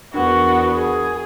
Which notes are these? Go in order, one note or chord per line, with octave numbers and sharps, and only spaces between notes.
E2 B3 D4 F#4 A#4
G#4